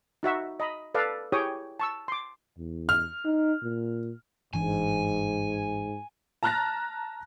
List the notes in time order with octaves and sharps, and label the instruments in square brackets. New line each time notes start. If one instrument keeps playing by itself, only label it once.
[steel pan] D#4 F#4 E5 F#5
D#5 A#5 B5
A4 B4 D5 F5
E4 G4 G#4 C#5 G5 D#6
A5 C#6 E6
C6 D6
[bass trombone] E2
[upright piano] F6
[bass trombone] D#4
A#2
[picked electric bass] G1 E3 D4 [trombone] G#2 [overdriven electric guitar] G#5
[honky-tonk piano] A5 A#5 F6 F#6 A6 A#6